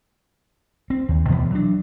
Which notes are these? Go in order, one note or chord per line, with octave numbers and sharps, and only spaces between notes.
C4
D#2
D2 B2 E3 B3
F#3 D4